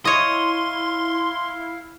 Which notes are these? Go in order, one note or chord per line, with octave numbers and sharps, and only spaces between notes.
E4 C#5 D#5 F5 C6